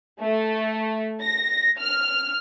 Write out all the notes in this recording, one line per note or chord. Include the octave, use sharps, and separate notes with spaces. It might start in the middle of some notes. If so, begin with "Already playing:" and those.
A3
A#6
F6